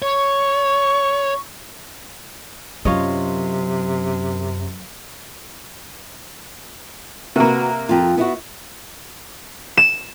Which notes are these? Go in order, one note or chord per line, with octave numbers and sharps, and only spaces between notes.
C#5 C#6
F#2 C3 F#3 F4 C#5 D#5
C3 A#3 F#4 B4
F2 F4
B3 E4 F#4
E7